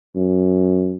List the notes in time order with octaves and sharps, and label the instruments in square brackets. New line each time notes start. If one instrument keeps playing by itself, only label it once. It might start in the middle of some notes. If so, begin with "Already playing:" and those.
[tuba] F#2